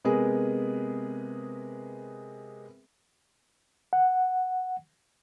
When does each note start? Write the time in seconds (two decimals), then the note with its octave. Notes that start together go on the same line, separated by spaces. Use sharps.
0.04 C3 G#3 B3 G#4 A#4 B4
3.93 F#5